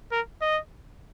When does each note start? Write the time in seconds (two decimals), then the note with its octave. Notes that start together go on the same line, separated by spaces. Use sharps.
0.12 A#4
0.41 D#5